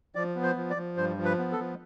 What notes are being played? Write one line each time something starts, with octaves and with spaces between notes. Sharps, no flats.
F3 D5
B3
C5
F3
D5
F3
G2 C5
F3
B4
B3
A4
F3